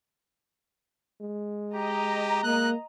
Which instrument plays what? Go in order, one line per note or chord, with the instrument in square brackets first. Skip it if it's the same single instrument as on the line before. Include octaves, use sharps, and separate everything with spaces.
[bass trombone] G#3
[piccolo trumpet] G4 [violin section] D#5 A#5
[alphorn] A#3 [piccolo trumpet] F#6